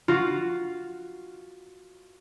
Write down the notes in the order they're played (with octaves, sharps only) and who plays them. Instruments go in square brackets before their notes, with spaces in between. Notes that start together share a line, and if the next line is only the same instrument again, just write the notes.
[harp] F4 F#4